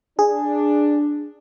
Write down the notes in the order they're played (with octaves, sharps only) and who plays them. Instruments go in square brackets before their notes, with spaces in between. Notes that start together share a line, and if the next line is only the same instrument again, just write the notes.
[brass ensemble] D4 [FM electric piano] G#4